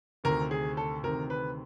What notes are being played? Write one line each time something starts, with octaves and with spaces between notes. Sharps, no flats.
D2 C3 D#3 A#4
G#4
A4
D2 C3 D#3 A#4
B4